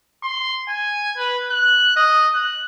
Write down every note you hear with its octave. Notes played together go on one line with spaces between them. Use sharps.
C6
G#5
B4
F#6
D#5
F#6